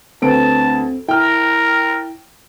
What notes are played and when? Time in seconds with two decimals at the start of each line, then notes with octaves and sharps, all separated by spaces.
0.22 D2 C4 B4 A5 D7
1.09 E4 A#4 G5 F6